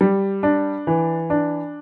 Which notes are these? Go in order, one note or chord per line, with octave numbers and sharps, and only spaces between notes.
G3
D4
E3
D4